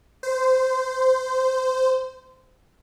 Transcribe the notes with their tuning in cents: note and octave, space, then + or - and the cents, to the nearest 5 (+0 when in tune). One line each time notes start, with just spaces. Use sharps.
C5 -20